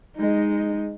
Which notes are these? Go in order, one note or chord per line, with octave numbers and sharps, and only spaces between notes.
G#3 D#4